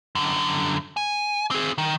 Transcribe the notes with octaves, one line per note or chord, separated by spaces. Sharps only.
F#2 D3
G#5
C4 G#4
D#3